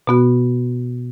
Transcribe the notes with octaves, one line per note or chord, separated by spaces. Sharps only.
B2 B3 F#4